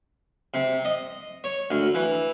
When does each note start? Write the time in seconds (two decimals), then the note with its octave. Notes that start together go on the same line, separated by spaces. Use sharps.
0.54 C3
0.85 D#5
1.44 C#5
1.71 D2
1.95 E3